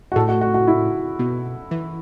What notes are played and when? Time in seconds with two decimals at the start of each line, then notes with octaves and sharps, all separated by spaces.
0.12 F#4
0.16 A2 A4
0.28 F#4
0.41 F#4
0.54 F#4
0.67 E4
1.19 B2
1.71 E3